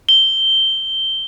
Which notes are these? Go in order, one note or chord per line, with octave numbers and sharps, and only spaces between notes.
G7